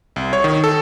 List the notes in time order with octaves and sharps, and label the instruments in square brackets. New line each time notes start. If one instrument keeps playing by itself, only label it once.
[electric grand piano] C2
C#5
D#3
A4